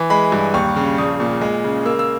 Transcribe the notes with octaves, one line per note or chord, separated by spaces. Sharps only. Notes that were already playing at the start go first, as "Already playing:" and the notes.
Already playing: E3
G#3 B5
G2
D#2 C#6
C#3
A#1 D#6
A#2
G#3
C#3
A#3 E6
E6